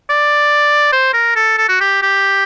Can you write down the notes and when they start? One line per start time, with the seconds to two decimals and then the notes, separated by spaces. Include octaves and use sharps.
0.10 D5
0.92 C5
1.14 A#4
1.36 A4
1.58 A4
1.69 F#4
1.81 G4
2.02 G4